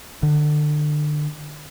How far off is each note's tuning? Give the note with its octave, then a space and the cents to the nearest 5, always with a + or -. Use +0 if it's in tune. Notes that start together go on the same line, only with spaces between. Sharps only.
D3 +30